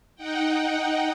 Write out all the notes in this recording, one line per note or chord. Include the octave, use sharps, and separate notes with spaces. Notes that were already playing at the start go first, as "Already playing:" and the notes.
D#4 F#5 G5